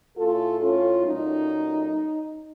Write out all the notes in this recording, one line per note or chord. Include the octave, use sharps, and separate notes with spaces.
A2 A3 C#4 F4 A4
C#4 F4
A#2 F#3 A3 C#4 D#4